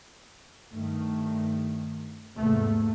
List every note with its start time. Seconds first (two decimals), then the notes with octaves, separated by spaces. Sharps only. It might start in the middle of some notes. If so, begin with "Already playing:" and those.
0.71 G2 D#3 A3
2.37 E2 G#2 C3 A3 A#3